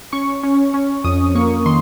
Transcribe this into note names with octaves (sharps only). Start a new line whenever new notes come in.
C#4 C#6
C#4
C#4
F2 D#6
A#3 C#6
D#3 C6